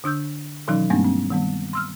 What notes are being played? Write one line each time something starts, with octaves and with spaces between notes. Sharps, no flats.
D3 D4 E6 G6
B2 D#3 E3 F#3 C#4 D#4
G2 G3 A3 A#3 C4 D4
C4
D#3 G3 B3
C6 E6 F6